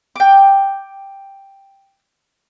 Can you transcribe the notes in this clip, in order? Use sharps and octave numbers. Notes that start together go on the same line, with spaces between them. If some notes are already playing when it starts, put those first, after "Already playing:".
G5 D6